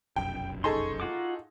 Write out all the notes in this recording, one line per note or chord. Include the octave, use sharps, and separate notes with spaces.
F1 B1 F#2 G5
D#4 G#4 A4 C6 C#6
F4 F#4 D6